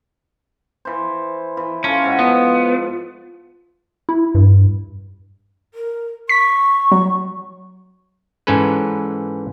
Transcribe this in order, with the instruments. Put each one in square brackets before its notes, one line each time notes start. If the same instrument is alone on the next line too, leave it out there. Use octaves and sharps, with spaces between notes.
[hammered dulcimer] E3 C5
E3
[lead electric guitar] C#4 [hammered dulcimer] F4 A4 F5
[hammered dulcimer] G#2 F#4
[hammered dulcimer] F3 [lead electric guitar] B3
[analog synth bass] E4
G2
[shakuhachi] A#4
[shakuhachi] C#6 [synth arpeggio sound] B6
[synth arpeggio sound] F#3
[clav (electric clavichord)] G#2 E3 C#4 A4 B4